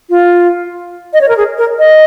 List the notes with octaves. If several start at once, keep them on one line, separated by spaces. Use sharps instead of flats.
F4
D#5
C#5
A#4
G#4
A#4
D#5